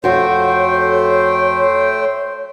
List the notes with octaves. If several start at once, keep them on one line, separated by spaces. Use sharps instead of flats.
F2 A3 F#4 C5 C#5 G5